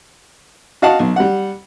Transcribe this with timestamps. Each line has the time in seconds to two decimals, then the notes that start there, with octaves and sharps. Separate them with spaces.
0.82 F#4 D#5 F5 F#5 A5
0.99 B1
1.16 G3 F#5